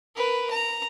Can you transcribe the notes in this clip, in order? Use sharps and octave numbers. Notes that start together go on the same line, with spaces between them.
A#4 B4
A#5